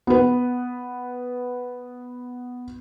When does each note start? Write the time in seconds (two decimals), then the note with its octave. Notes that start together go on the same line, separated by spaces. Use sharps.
0.07 B3 B4